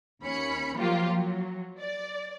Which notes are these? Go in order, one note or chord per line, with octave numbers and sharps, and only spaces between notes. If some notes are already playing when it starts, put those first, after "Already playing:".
D#2 C#4 B5 C#7
F3 F#3 A#3 F4 G4
F#3
D5